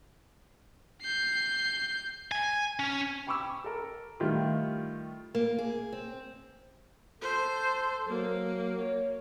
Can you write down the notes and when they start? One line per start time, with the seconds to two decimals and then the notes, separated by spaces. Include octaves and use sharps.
1.02 G6 C7
2.32 G#5
2.79 C#4
3.27 G5 B5 C#6 D6 E6
3.64 A4 A#4
4.20 D#3 G3 A3 E4 F4 G4
5.35 A#3
5.59 G#4
5.93 C4
7.21 A4 C5
8.08 F#3 A#3
8.77 C#5